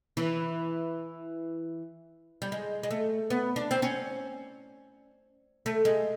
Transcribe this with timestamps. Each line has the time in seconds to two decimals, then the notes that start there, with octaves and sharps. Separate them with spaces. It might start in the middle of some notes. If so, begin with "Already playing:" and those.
0.17 E3
2.42 G3
2.52 G#3
2.83 G#3
2.91 A3
3.30 B3
3.56 D4
3.71 C4
3.82 C#4
5.66 A3
5.85 G#3